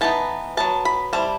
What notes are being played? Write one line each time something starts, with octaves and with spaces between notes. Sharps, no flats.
E3 B3 D#4 A5
F#3 B3 D#4 A5
B5
G3 C4 E4 A5